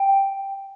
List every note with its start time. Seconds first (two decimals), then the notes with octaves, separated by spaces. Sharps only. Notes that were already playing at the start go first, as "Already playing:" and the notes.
Already playing: G5